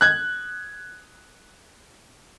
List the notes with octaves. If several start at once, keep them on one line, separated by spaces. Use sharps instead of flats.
F#6 G#6